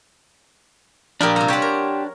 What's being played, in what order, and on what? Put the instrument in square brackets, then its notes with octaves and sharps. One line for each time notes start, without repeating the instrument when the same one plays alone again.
[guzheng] A#2 F3 [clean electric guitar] D4 [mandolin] G4 A#4 B5
[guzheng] C3 G3 [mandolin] A#5
[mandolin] G4 C5 [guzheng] C#5 F#5
[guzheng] A#4